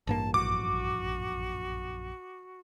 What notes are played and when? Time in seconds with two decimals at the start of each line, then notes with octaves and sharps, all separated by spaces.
0.07 A1 G2 A#3 A5
0.34 A#1 F#2 F#4 D6